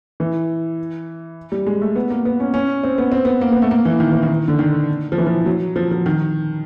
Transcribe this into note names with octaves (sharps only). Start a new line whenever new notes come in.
E3
G3
G#3
A3
B3
A#3
B3
C#4
C#4
C4
B3
C4
B3
A#3
B3
A3
A#3
E3
D#3
E3
D#3
D3
D#3
F3
E3
F3
F#3
F3
F3
D#3